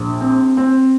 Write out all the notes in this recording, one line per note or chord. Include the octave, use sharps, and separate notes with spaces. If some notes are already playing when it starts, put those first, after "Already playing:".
Already playing: A#1
C4
C4